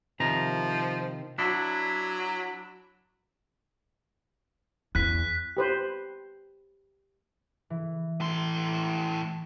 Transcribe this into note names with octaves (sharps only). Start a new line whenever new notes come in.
C3 D#3 F3 A#5
F#3 D4 E4
E2 F#6 B6
G4 B4 C5
E3
A2 C6